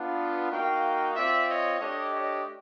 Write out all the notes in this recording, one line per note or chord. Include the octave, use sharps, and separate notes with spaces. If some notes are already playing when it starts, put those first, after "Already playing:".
Already playing: B3 D4 F4
A#3 D#4 F#4 F5 G5
C4 F4 D5 E5
C#5 D#5
A3 D4 G4 C#5 D#5
C#5 D#5